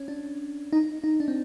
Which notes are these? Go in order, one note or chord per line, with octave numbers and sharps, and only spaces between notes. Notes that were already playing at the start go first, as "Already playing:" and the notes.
Already playing: C#4
D4
D#4
D#4
D4
C4